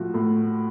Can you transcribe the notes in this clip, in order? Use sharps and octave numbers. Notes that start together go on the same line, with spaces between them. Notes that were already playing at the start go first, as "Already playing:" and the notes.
Already playing: A2 F3 F#4
A2